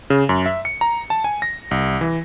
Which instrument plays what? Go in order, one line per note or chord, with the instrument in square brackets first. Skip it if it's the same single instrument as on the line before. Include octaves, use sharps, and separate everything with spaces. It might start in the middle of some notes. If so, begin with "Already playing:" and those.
[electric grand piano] C#3
F#2
E5
C#7
A#5
A5
G#5
A#6
C2
E3